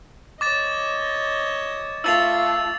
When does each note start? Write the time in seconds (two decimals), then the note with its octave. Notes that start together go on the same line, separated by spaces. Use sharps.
0.41 C#5 D#5 D6 A6 E7
2.04 A3 F4 E6 A6 F7